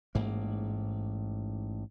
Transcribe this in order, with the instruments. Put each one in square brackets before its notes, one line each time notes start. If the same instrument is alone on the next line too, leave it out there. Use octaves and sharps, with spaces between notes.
[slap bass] A1 G#2 A#3